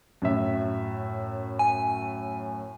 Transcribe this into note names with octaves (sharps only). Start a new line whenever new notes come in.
F#2 A2 E5
G#5